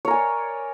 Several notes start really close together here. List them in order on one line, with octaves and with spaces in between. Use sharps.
C#5 A#4 G#5 D5